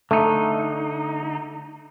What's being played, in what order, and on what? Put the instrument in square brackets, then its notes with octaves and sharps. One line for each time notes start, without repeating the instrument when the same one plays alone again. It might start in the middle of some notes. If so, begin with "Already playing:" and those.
[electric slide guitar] D3 D#4 [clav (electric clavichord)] A3